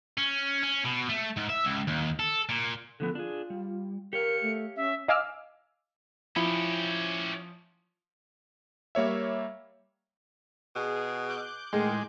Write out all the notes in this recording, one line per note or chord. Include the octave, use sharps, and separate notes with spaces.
C#4
C#4
B2
A3
G#2
E5
C#2
D#2
A4
A#2
D3 F3 B3 A4
D4 F4 G#4
G3
G4 A#4 C#5 F5 C#7
A3
C#4 E5
D#5 F5 G#5 D6 E6 F6
F3 C#4 E4 G4
G3 A#3 C#5 E5
B2 G#4
D6 F#6 G6
A2 D#3 G#3 G#4 C6